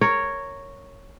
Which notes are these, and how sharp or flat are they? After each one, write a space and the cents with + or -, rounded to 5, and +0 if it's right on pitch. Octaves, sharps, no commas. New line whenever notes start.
A#4 -10 C#5 +0